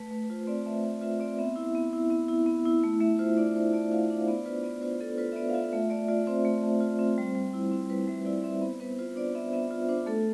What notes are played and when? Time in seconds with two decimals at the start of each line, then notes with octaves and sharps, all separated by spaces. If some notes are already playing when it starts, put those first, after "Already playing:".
Already playing: A3 B4
0.11 A3 B4
0.24 B4
0.30 F4 C5
0.47 C4 D5
0.66 A3 E5
0.84 A3 E5
1.01 F4 E5
1.20 C4 D5
1.38 B3 E5
1.56 E4
1.75 B3
1.93 E4
2.10 B3
2.28 E4
2.46 B3
2.66 E4
2.84 A3
3.00 A3 E5
3.19 F4 C5
3.37 D4 D5
3.56 A3 C5
3.73 A3 D5
3.92 F4 F5
4.09 D4 E5
4.21 C5
4.27 B3 D5
4.45 F4 B4
4.63 B3 D5
4.82 F4 C5
5.01 B3 A4
5.18 F4 B4
5.32 E5
5.36 B3 D5
5.50 F5
5.54 F4 E5
5.73 A3 E5
5.90 A3 D5
6.08 F4 D5
6.27 C4 C5
6.45 A3
6.63 A3
6.81 F4
6.99 C4
7.18 G3
7.35 G3
7.53 E4
7.72 C4
7.90 G3 B4
8.08 G3 E5
8.25 E4 D5
8.44 C4 E5
8.61 B3 C5
8.80 B3 B4
8.98 F4 C5
9.16 D4 D5
9.35 B3 E5
9.53 B3 E5
9.71 F4
9.89 D4 C5
10.07 A3 A4